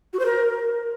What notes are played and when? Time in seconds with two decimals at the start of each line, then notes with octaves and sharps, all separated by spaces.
0.13 F#4
0.19 C5
0.25 A#4